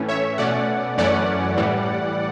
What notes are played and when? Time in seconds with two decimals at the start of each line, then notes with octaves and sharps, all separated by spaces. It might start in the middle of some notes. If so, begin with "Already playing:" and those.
Already playing: A2 E3 A3 C#4
0.09 C#5 E5
0.38 B2 A3 C#4 D5 F#5
0.98 F#2 E3 A3 C#4 D5 F#5
1.57 A2 E3 G3